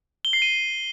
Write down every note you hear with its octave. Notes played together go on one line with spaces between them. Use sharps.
G7
C7
D#7